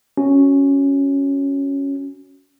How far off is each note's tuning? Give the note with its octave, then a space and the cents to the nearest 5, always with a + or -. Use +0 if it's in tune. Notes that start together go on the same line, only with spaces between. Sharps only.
C#4 +0 F#4 +0